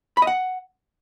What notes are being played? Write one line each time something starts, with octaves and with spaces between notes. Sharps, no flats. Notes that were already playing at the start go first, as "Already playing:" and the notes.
B5
D#5
F#5